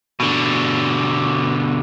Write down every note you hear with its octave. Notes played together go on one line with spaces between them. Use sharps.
B2 D3